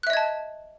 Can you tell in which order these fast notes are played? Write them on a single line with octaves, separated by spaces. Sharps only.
F#6 E5 D#5 G#6 A5